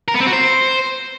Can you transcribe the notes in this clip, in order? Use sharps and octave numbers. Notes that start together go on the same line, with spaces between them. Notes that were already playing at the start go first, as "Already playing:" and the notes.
A#4
B3
C4
F#4
C5